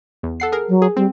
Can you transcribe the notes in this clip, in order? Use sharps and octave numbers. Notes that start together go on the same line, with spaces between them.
E2
A4 F#5 C7
G#4 A#4
F#3
G#4
G3 C4